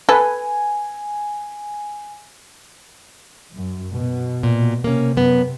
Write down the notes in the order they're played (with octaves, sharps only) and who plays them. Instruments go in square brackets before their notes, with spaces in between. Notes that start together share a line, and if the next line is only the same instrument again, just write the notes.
[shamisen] A4 [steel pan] B4 [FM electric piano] G#5
[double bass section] F#2
B2
[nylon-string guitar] A#2
[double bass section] C3 [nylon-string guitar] A#3 C#4
[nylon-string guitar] F#2 B3